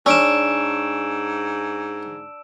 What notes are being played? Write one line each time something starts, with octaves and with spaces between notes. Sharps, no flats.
G#2 C#4 D4 A5 E6 D7 E7